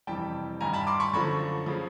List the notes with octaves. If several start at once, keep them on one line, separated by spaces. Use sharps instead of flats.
F2 C3 E3 G3 G5 A5
G2 D#3 G3 G#5 A#5
A5 B5
C6 D6
B5 C#6
F#2 D3 F3 B5 C#6
C#3 F3